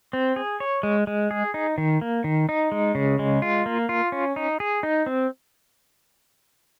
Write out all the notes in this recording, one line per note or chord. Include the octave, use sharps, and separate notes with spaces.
C4
G#4
C#5
G#3
G#3
G#4
D#4
D#3
A#3
D#3
D#4
G#3
C#3
G#3
F4
A#3
F4
C#4
D#4
G#4
D#4
C4